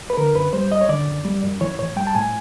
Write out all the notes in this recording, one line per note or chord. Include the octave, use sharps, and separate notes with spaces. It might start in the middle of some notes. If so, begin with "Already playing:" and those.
B4
D3 A#4
F#2 B4
G3 C5
F#2 D#5
C#5
D3 D5
F#2
G3
F#2
E3 C#5
A2 C#5
G3 G5
A5
A2 G#5